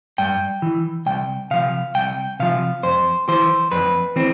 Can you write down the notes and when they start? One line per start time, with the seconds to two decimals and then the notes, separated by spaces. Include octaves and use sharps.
0.18 G2 G5
0.62 E3
1.06 C2 G5
1.51 C3 F3 F5
1.95 C2 G5
2.40 C3 F3 F5
2.83 F2 C5
3.28 E3 C5
3.72 F2 B4
4.16 E3 C4